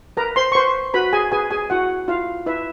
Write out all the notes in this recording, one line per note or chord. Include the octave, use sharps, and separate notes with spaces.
A#4 B4 A#5
C5 C6
C#6
B4 C5 C6
F#4 B4 B5
G#4 G#5
G#4 B4 G#5
G#4 G#5
E4 F#4 F#5
E4 F4 F5
E4 B4 E5